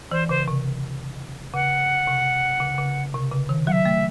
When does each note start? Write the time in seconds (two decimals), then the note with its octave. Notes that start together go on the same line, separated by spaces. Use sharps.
0.11 E3 C5
0.29 C#3 C5
0.48 C3
1.54 C#3 F#5
2.07 C3
2.60 C#3
2.78 C#3
3.14 C3
3.32 C#3
3.49 D#3
3.67 F#3 F#5
3.72 E5
3.85 A3